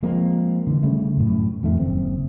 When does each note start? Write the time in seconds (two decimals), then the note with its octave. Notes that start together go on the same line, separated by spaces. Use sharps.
0.03 F3 G#3 A#3 C4
0.67 D3 E3
0.83 C#3 G3 A3
1.17 F#2 A2
1.63 F2 D#3 A3
1.79 F#1 C4